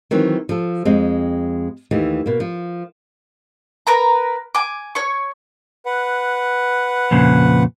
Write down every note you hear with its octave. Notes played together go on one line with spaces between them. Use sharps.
D#3 E3 F#3 C4
F3 A4
F2 G#3 C4
D#2 E3 A3
B2 A#3
F3
A#4 B4 A#5
G#5 D6
C#5 C#6
B4 F#5
F2 A#2 C#3